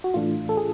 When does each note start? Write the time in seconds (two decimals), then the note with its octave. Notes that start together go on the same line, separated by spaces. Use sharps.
0.04 F#4
0.14 A2 E3 A3 D4 F4
0.49 A4
0.57 G#4